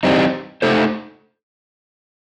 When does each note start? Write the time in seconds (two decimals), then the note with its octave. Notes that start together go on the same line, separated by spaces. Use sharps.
0.03 E3 G3 C4 D#4
0.62 A3 D#4 A4 C5